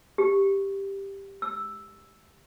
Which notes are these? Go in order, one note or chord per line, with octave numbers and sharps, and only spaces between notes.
G4
E6